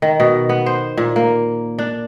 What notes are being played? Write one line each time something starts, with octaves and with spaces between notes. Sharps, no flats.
D#3
B2
B3
C5
A#2
A#3
D4